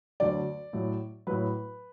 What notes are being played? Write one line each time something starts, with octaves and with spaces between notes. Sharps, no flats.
D2 D3 F#3 D5
A2 F#3
A2 F#3 B4